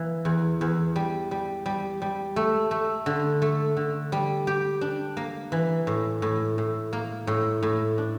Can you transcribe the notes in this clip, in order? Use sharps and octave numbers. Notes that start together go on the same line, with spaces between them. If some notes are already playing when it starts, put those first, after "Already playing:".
Already playing: E3 A#3
E2
E2
G3
G3
G3
G3
A3
A3
D3
A3
D3
G3
G4
D4
A#3
E3
A2
A2
A2
A#3
A2
A2
D4